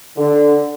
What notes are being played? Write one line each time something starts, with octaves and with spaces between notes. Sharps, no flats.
D3